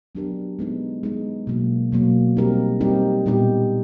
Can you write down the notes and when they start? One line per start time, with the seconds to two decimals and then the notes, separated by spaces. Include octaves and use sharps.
0.15 F#3 B3 D4 G4 A#4
0.59 G#3 B3 D#4
1.03 G#3 B3 D#4
1.47 B2 F#3 A#3
1.92 B2 F#3 A#3
2.37 G3 C4 D#4 G4 A#4
2.81 G3 C4 D#4 G4 A#4
3.26 A#2 G3 B3 D#4 G4